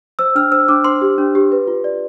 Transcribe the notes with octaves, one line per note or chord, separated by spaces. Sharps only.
C5 E6
D4 F6
C5 E6
D4 D6
C5 C6
G4
D4
G4
B4
F4
D5